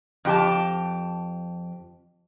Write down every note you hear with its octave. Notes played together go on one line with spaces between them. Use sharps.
F2 G4 A5